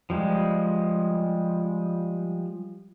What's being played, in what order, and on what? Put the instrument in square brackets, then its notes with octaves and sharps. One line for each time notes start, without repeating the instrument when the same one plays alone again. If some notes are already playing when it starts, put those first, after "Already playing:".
[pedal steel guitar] F3 G3 G#3